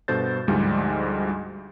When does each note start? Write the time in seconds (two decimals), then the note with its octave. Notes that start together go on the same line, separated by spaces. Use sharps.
0.08 G2 B2 A4 C5 G6 A6
0.48 D2 G#2 F3 G3 G#3